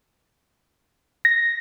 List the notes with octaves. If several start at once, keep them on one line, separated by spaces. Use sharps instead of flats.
A#6